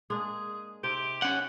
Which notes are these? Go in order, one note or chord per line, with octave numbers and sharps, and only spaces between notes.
G#3 A#3 D4 G#4
C3 C4 D#4 G4
C#4 F#5